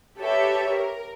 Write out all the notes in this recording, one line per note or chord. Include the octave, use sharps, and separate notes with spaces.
G4 A4 B4 C#5 E5
A#4